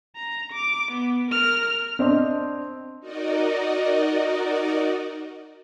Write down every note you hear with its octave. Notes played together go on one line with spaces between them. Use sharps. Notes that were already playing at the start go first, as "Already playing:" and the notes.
A#5
D6
B3
A#4 F6
C4 D4 D#5 C6
D#4 F#4 A#4 D5 D#5